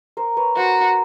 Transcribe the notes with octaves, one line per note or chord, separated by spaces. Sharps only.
A#4 C5
B4 C#5
F#4 A#4 C5